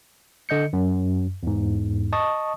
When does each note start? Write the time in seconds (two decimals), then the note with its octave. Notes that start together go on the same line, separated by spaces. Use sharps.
0.49 D3 D#5 G6 C#7
0.73 F#2
1.43 E2 G#2
2.13 D#5 A5 C#6 D#6